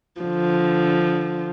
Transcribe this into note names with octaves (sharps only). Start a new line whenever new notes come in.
D3 F3